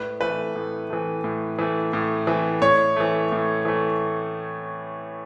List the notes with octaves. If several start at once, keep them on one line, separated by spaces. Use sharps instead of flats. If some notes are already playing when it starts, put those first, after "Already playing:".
Already playing: A2 B4
E3 A3 B4
A2
E3 A3
A2
E3 A3
A2
E3 A3
A2 C#5
E3 A3
A2
E3 A3